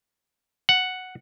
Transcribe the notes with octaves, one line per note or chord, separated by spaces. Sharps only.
F#5